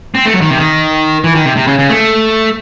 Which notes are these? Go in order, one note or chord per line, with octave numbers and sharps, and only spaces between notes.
C4
A3
F#3
D#3
C3
D#3
E3
D#3
C3
C3
C#3
C#3
A3